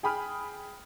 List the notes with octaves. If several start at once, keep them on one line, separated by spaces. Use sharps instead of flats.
G#4 G5 B5 D#6 F6